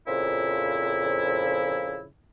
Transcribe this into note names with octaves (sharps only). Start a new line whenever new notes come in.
F2 A#2 C#3 F3 E4